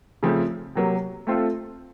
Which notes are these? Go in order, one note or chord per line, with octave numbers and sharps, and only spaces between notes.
C#3 F3 A3 C4
C3 F#3 A#3
A3 C4 F4 A4